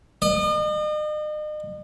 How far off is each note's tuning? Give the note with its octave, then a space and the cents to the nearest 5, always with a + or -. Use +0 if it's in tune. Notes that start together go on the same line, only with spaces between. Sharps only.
D#5 -40